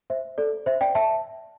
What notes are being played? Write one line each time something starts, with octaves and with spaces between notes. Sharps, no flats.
C5 E5
A4 D5
C5 E5
D5 G5
E5 A5